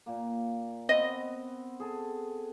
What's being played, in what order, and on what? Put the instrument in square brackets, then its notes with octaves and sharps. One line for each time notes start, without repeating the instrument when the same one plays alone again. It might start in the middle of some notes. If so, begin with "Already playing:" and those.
[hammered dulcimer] A#2 A#3
[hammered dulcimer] B3 C4 [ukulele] D#5
[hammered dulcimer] G#4 A4